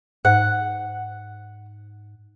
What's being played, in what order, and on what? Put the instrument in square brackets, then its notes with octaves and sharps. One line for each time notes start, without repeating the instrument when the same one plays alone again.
[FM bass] G#2 [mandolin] F#5